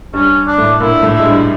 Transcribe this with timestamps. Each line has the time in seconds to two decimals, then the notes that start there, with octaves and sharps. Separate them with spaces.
0.14 G2 G3 C#4
0.47 D4
0.58 A2 A3
0.80 A#2 A#3 E4
1.02 A2 A3
1.13 E4
1.19 G#3
1.25 G2 G3